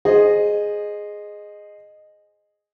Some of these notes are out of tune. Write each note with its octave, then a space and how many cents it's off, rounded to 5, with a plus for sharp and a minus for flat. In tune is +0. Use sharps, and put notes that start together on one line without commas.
G#4 +0 C5 +10 D#5 -15